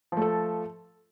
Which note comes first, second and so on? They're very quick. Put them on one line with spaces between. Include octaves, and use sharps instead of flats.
F3 A3 A4